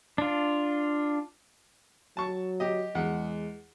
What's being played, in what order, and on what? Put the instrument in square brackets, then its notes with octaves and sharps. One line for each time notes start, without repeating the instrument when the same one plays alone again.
[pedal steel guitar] D4 F4
[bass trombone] F#3 [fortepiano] A5 C#6
[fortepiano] G4 D#5
[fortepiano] E2 F#5 [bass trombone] G#3